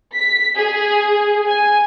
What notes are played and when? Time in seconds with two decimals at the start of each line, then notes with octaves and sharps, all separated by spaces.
0.15 B6
0.56 G#4
1.47 G#5